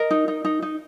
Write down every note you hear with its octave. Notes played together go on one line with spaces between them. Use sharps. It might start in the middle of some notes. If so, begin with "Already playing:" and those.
Already playing: A#4 D#5
D#4
D#4
D#4
D#4